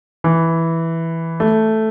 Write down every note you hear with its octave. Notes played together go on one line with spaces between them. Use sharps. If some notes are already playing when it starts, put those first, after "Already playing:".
E3
A3